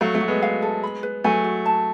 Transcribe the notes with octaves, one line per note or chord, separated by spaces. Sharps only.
F#3 A3 F5
F#3 A3
F#4
G#3 B3
F5
A4
B5
B4
F#3 A3 G#5
F#4
A5